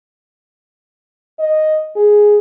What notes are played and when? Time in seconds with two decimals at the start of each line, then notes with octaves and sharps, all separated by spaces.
1.39 D#5
1.96 G#4